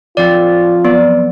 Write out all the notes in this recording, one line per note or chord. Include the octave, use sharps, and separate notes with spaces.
F3 C4 F4 A4 D5
F#3 B3 D5